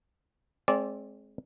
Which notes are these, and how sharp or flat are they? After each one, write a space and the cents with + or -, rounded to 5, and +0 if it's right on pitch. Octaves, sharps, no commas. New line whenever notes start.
G#3 +20 C4 +25 D5 -15